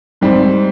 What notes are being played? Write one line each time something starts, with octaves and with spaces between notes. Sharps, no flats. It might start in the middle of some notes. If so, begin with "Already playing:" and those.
G#2 G3 C4